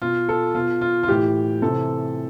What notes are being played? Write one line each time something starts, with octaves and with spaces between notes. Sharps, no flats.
B2 F4
A4
B2 F4
F4
F4
A2 E3 G4
C3 E3 A4